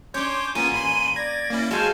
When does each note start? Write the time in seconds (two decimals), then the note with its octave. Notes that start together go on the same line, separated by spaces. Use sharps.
0.14 C#4 D4 C#5 C6 D6 G6
0.55 A#3 B3 C#4 F4 G#5 D#7
0.72 A1 B5 C6
1.16 D5 G#6 A#6
1.50 A#3 C#4 E4
1.71 G#3 F#4 A4 C5 F5 G#5 A5 F6